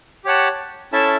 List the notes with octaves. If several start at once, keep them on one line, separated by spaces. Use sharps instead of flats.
G4 C#5 F#5 A5
C#4 E4 A4 E5 A5